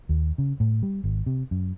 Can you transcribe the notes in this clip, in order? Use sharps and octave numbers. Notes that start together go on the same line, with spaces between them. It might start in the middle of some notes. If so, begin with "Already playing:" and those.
D#2
C#3
A2
G3
G#1
C3
F#2